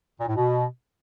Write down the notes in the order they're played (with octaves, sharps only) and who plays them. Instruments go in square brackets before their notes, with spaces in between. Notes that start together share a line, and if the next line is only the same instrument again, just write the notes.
[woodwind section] A#2
A2
B2